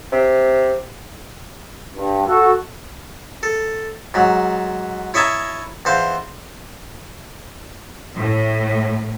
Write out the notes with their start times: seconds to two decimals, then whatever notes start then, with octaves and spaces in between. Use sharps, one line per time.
0.12 C3
1.96 G2
2.26 F#4 A4
3.43 A4
4.14 G#2 F#3
5.14 E4 C#5 D#5 E5 A5 A#5
5.85 E2 C5 F5
8.16 A2